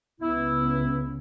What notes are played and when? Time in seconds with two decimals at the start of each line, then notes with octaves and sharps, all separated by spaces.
0.21 C#2 C#3 B3 E4